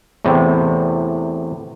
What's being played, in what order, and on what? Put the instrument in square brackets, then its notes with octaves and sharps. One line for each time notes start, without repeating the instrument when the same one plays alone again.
[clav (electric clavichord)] E2 A2 C3